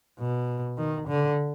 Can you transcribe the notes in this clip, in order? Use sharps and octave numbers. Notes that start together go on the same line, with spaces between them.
B2
D#3
D3